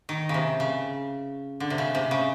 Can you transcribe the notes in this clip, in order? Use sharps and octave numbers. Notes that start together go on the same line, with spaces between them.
D#3
C#3
C3
C#3
D3
C3
C#3
C3
C#3